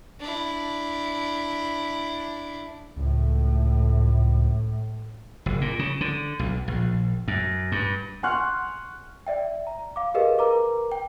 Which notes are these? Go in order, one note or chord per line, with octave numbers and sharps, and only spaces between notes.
D4 E4
C#2 A2
F#1
A#2
C#3
D3
B1
A#1
F#2
G2
F#5 G#5 C6 C#6 F6 F#6
D5 E5 G5
A#5
F5 D6
G4 G#4 A#4 B4 D#5 F5
A#4 B4 A#5 D6
G5